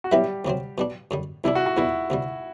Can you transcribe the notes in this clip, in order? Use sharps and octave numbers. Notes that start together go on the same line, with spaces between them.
F#4
F#3 G3 B3 E4 G4 B4 E5
D2 C3 F#3 C4
B2 G3 D4
F#2 D3 G3
C2 C3 G3 D4 E4
F#4
F#4
E2 B2 G3 E4
D2 C3 G3